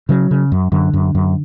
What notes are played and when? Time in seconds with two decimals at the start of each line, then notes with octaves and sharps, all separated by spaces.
0.09 C#3 F#3
0.31 C#3
0.52 F#2
0.72 F#2 D3
0.94 F#2
1.15 F#2